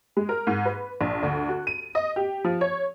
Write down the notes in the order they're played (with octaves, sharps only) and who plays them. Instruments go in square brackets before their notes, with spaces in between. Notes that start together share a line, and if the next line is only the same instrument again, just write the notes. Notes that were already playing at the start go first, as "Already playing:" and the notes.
[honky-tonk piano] G#3
A#4
G#2
B4
A#1
D2
F#4
D#7
D#5
G4
F3
C#5